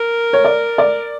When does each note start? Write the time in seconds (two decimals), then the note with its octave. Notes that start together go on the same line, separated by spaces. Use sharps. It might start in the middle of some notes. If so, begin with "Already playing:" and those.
Already playing: A#4
0.33 C#5
0.45 D5
0.78 D5